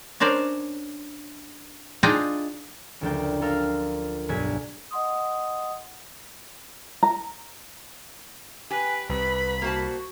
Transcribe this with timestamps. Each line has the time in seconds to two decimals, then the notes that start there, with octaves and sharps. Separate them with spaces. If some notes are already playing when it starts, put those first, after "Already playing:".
0.20 C#4 D4 A#4 C5 D5
2.03 D4 D#4 F4 G#4 D#5 G5
3.01 F#1 D2 F3 D4 A#4 G5
3.41 F4 A4 A#4 F5 C6 F6
4.29 B1 G2 F#3 G#5 B6
4.91 D#5 F#5 C6 D#6
7.03 A#5
8.70 G4 B4 G#5
9.09 C2 C3 B4 B5
9.62 A#3 F#4 C5 A5